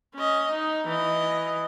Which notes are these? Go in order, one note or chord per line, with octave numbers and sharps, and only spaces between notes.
C#4 D#5
D#4
E3 D#5